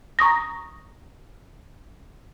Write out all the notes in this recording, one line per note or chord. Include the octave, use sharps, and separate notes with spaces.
A#5 C#6 D#6 A#6